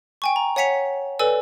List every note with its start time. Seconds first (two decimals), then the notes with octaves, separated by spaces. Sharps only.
0.22 G5 G#5 C#6
0.36 A#5
0.56 C#5 F#5 G#5 B6 C#7 F7
1.19 A4 B4 D5 G#5 E6